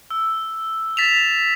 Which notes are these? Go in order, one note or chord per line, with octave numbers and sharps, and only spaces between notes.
E6
A6 B6 E7 F7